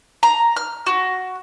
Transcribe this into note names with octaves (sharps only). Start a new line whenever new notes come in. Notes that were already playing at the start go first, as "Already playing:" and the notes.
A#5
F6
F#4